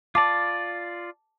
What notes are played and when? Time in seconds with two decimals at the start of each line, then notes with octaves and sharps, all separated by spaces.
0.15 F4 D5 A5 D6